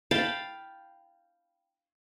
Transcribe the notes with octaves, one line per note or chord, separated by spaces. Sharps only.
F5 G5 A5 B5